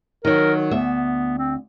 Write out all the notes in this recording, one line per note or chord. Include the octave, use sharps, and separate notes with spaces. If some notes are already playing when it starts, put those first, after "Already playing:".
D#3 F#3 A#4
D2 B3 E5
C4